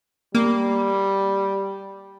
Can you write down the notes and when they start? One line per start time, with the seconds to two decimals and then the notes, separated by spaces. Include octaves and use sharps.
0.35 G3 A#3